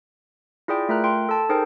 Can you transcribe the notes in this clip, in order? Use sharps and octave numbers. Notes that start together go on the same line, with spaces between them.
E4 F4 G#4 D5 G5
A3 F4 A#4 A#5 F6 F#6
G5 C6
A4 A5
D#4 G#4 A#4 C5 G5